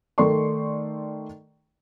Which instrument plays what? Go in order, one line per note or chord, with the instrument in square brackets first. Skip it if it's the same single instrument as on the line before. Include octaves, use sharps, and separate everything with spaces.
[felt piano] D#3 A3 A4 D5 C6 C#6